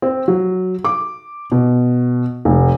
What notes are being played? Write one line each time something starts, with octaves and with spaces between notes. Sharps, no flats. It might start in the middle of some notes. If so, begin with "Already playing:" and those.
C4
F#3
D6
B2
F1